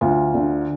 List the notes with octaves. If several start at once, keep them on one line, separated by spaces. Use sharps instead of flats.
D2 F4
D3